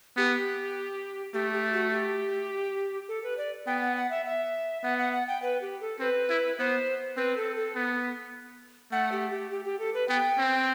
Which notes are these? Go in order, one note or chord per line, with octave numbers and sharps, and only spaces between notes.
B3 G4
A3 G4
G4
F#4
G4
A4
B4
D5
B3 G5
F#5
F#5
E5
E5
B3 F#5
F#5
F#5
G5
B4
G4
A4
C4 B4
E4
B3 C5
C4 B4
A4
A4
B3
A3 F#5
G4
G4
G4
G4
A4
B4
B3 G5
C4